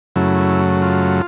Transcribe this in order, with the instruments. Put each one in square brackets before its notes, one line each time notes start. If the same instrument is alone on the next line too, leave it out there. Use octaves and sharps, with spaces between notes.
[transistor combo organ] F#2 C#3 F#3 A3 E4
F4